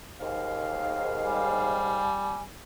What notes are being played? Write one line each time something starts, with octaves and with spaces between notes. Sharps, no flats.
D#2 G#2 F5
G3 G#5